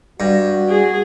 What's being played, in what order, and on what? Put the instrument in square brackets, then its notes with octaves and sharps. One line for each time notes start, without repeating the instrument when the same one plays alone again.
[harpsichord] G2 [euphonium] F#4
[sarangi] G#4